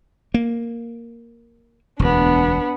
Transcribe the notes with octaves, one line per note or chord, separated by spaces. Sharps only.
A#3
E1 D2 B3 D4